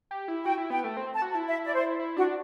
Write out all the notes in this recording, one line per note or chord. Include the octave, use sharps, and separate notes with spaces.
G4
E4
F#4 G5
E4
B3 G5
A3
C4
A5
F#4
A5
E4
E5
D5
C5
E4
D4 F#4